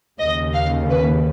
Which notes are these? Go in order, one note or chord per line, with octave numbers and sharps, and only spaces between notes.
D#2 C#3 D#5
F5
B4